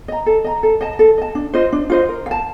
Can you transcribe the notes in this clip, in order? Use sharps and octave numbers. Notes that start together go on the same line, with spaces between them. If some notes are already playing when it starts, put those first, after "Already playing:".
D#5 A#5
A4
D#5 A#5
A4
D#5 A5
A4
D#5 A5
D4
F4 C5 D#5
D4
F4 C5 D#5
A#4
F5
A5